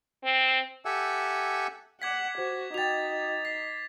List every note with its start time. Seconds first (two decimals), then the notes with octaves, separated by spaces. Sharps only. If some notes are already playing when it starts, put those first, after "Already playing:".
0.24 C4
0.85 G4 A4 E5 F#5 G#5 E6
2.02 F#5 D6 G#6 B6
2.38 F#4 C5
2.74 D#4 F#4 G5 A6 F7
3.45 B6 C7